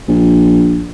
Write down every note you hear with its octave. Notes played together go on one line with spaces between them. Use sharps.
A#1